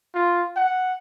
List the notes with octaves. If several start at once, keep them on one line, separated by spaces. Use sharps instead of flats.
F4
F#5